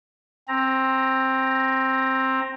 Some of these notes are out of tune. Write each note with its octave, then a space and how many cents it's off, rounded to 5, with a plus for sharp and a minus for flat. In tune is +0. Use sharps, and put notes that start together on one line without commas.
C4 +10 A#5 +0